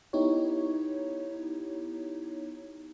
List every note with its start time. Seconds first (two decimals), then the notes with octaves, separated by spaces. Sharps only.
0.13 B3 D#4 E4 G4 C#5